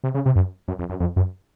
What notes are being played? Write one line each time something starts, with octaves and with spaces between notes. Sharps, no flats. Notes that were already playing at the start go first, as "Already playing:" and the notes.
C3
C#3
C3
F#2
F#2
F2
F#2
F2
F#2